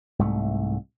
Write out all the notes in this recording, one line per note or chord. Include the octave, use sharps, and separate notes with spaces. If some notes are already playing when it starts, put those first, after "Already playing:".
C2 G#2 A3